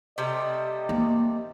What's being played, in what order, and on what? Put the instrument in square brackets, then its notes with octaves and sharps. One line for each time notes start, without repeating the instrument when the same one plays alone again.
[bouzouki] C3 G3 A3 [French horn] D#5
[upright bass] A#3